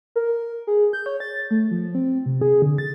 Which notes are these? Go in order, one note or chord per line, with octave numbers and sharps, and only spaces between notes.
A#4
G#4
G6
C#5
A6
A3
F3
C4
C3
G#4
D3
A6